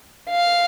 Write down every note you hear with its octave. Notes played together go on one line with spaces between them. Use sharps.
F5